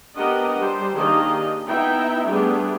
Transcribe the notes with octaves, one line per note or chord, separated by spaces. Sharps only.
B3 D4 G4 A#4 D#5 F#5
G3 G4 C5
D#3 A#3 D4 G4 G#4 D#5
B3 D#4 E4 E5 G5
G3 A3 B3 D4 G4 G#4